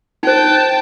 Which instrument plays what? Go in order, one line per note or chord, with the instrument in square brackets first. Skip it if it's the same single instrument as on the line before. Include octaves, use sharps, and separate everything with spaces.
[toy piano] D#4 C5 [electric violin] G5 A5